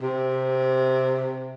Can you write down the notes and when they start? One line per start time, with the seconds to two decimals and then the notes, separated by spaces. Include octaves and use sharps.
0.02 C3